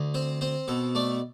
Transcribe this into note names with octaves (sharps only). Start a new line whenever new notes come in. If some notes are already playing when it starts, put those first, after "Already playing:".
Already playing: D2
C4 C5
C4 C5
B2 A4
A3 D5